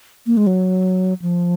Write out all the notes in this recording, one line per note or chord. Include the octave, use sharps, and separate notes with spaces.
A#3
G#3
F#3
F3